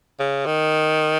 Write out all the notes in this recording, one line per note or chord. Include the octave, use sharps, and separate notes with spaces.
C#3
D#3